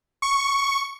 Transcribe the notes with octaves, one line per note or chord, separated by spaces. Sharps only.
C#6